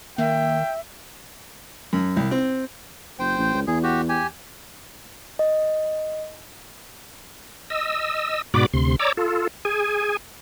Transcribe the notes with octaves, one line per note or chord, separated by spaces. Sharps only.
D#3 A#3 E5 G5
F#2
C2
C4
F#1 C5 G5
A1
C#2
E2 G#4
F#4 G4
G4 G#5
D#5
D#5 E6
G#2 B2 F#4 D5 B5 D6
D2 C3 C6
C#5 D5 A#5 D6 E6
F4 A4
G#4 G#5